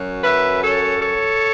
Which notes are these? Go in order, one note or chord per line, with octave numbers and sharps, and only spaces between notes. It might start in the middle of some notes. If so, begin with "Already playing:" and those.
Already playing: F#2 F#3
B4 E5
A4 C#5
A4 C#5